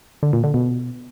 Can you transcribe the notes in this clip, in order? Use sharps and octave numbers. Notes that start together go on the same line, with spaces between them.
D3
A#2
D3
B2